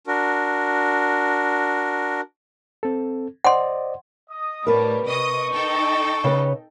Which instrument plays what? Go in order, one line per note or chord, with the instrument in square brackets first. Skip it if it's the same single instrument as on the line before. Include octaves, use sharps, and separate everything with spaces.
[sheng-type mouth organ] D4 F#4 A#4
[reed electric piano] C4 A4
[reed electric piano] C5 D5 D#5 [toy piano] F#5 C6
[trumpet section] D#5 D#6
[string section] A2 G3 [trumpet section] D4 C#5 A5 [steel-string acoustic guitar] A#4 B4
[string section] C3 D#5 D#6 [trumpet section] C#6
[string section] D#4 A4 G5
[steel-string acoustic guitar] C#3 B4 C#5